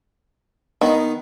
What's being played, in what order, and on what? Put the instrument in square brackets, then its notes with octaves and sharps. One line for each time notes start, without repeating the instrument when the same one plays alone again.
[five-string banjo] D#3 [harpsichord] B3 D#4